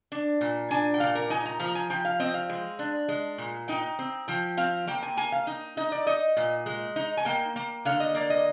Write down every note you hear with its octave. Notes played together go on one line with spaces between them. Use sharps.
D4
A#2
D4 G#5
G5
A#2 F5
A#4
D#4 G#5
A#5
F3 A#5
G#5
F3 G5
F5
C4 D#5
F5
G#3
D4
G#3
A#2
D#4 G5
C4
F3 G5
C4 F5
A#3 G5
G#5
A#3 G#5
F5
D#4
D#4 D#5
D5
D#4 D#5
A#2
G#3
D#4
G#5
A#3 G5
A#3
D3 F5
D#5
A#3 D5
D#5